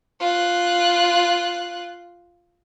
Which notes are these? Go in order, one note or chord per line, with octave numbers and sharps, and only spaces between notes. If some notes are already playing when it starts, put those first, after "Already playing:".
F4 F#6